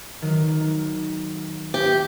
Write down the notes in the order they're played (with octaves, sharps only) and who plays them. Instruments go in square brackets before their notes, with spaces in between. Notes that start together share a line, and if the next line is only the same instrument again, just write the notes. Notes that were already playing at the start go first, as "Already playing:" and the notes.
[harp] D#3 F#3
[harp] B3 [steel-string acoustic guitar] G4